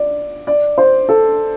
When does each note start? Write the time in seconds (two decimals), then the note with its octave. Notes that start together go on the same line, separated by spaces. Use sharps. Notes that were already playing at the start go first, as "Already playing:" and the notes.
Already playing: D5
0.47 D5
0.78 C5
1.09 A4